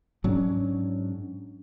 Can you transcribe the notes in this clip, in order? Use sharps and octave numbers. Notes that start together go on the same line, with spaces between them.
G#2 F#3 C#4 D4